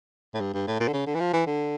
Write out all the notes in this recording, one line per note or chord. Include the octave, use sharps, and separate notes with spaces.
A2
G2
G2
A2
A#2
D3
C#3
D3
E3
F3
E3
D3